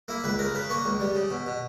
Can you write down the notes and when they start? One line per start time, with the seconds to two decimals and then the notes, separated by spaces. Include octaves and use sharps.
0.08 A#3 E4
0.24 C#2 B4
0.39 C#3 A#4
0.54 C#3 B4
0.69 A#3 C#5
0.85 C#2
1.00 G3
1.15 C#3
1.30 B2
1.47 B2